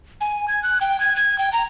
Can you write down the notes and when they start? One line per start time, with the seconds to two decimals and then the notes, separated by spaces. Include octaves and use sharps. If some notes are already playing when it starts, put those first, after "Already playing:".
0.21 G#5
0.48 G#6
0.63 F#6
0.81 G5
1.00 G#6
1.16 G#6
1.38 G5
1.53 A#5